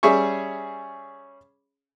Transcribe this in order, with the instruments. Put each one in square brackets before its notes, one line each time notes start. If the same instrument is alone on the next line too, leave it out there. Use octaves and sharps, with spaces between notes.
[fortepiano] G3 C#4 G#4 E5 C#6